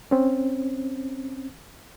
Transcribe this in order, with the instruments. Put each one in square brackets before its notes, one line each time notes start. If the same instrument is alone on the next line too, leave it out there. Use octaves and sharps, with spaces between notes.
[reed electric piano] C4 C#4